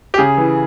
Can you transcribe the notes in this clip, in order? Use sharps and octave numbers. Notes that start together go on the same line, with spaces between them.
G4
C#3 G#4
E3